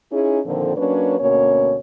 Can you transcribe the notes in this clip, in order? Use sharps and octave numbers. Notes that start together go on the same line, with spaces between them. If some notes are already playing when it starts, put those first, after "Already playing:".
C#4 D#4 E4 G#4
A#2 D3 D#3 F3 C4 A4
F#3 A#3 C#4 D4 B4 C#5
D2 B2 A#3 C#4 C#5